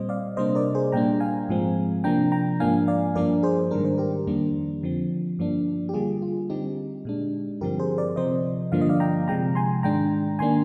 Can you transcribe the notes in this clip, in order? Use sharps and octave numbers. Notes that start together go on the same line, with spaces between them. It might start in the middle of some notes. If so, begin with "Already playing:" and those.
Already playing: A#2 G3 C4 C5 D#5
D5 F5
C3 G3 A#3 D4 C5 D#5
A#4 D5
G#4 C5
A#2 G3 A#3 D4 G5 A#5
F5 G#5
G#2 F3 G#3 C4
C3 F3 A#3 D4 G5 A#5
G5 A#5
G#2 F3 A#3 D4 F5 G#5
D5 F5
G2 F3 A#3 D4 A#4 D5
G#4 C5
G#2 D#3 G3 D4 A#4
C5
G4 A#4
F2 D#3 G3 A#3 D4
D3 F3 C4
G2 F3 A#3 D4
G4
D3 G3 A#3 F4 G#4
F4
D3 G3 C4 D#4 G4
A#2 G#3 D4
G2 D3 F3 C4 G4 A#4
G#4 C5
A#4 D5
C3 F3 C4 C5 D#5
G2 D3 F3 A#3 D4 F5
D#5
D5 F5
G5 A#5
C3 F3 G#3 G5 A#5
G#5 C6
G#2 D#3 G#3 D4 G5 A#5
D#3 A#3 D4 G#5 C6